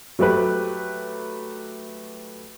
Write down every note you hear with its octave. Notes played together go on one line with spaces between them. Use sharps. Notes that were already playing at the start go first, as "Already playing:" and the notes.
F#3 A3 G4 B4